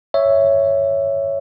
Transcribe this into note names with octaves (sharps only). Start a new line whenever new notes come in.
C#5 E5